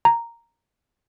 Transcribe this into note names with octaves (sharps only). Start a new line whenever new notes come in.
A#5